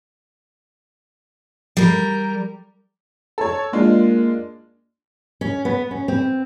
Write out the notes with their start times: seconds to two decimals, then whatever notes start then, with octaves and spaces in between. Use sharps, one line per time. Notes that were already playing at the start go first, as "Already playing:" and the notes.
1.77 G3 A#4
3.38 A4 C#5
3.73 G#3 A#3 D4 F4
5.41 C#4
5.65 B3
5.91 C#4
6.08 C4